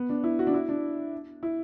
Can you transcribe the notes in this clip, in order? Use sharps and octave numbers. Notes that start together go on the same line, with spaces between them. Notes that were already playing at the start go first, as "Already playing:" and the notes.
Already playing: B3
D4
E4
F#4
D4
E4
D4
E4